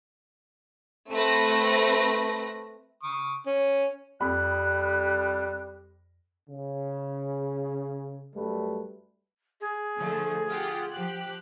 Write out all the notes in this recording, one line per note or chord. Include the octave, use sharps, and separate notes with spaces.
A3 C4 B4 A#6
C#6 D#6
C#4
F2 G3 B5 F#6
C#3
F#2 G3 A3 B4
G#4
D3 F3 A3
F4 G4 F#5
F3 G4 F#6